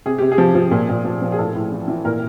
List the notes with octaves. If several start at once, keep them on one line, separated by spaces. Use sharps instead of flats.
C3 G#4
C3 G4
G#4
F3
F3
A#2
A#2
F3
F3
G#4
A2 A4
A2
E3
E3
A#2 A#4